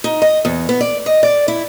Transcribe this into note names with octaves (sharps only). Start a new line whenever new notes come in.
D#4
D#5
E2
B3
D5
D#5
D5
E4